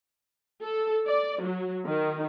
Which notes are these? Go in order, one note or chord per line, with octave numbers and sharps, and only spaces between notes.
A4
D5
F#3
D#3